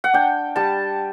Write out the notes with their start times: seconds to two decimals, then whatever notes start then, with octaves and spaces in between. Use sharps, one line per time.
0.04 F#5
0.13 D4 G5
0.56 G3 A5